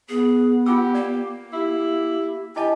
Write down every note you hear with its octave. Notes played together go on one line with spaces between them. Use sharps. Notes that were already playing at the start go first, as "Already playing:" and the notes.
B3 G#4
F4 G4 F#5 E6
A#3 D5
E4 G4
E4 G4 D#5 G#5 A5